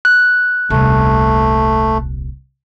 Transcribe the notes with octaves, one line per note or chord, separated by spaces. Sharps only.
F#6
D#1 C2 A3